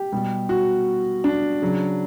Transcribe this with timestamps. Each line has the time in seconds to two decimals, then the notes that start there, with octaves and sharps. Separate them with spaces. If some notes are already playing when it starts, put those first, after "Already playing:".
Already playing: G4
0.12 B2 G3
0.49 F#4
1.24 D4
1.62 C#3 F#3